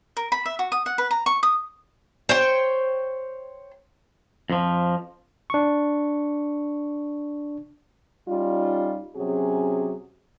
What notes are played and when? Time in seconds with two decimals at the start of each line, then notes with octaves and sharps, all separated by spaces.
0.17 A#4
0.32 B5
0.46 E5
0.59 F#4
0.72 D#6
0.86 F#5
0.98 B4
1.11 A#5
1.26 C#6
1.43 D#6
2.29 C5 C#5 G5
4.50 F2 F3
5.50 D4 C#6
8.28 G3 C#4 D#4 F4
9.16 C3 F#3 C#4 F#4 G#4